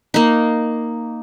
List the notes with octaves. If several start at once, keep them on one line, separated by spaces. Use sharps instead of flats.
A#3 D#4